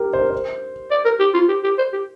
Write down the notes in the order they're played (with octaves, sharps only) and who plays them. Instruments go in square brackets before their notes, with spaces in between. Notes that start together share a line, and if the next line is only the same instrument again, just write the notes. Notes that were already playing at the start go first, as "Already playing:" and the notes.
Already playing: [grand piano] G4 A#4
C5
A#4
C5
[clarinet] D5
A#4
G4
F4
G4
G4
C5
G4